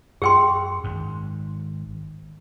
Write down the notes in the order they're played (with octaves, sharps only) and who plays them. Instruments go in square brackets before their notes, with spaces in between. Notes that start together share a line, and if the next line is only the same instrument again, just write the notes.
[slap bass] F#2 [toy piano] G#4 G5 C6
[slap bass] G#1 G#2